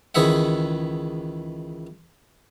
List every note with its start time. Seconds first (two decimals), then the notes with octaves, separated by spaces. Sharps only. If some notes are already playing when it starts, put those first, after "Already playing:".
0.15 C#2 D#3 E3 G#4 E5 F#5